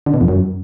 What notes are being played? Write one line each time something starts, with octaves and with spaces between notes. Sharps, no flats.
D3
B2
F2
F#2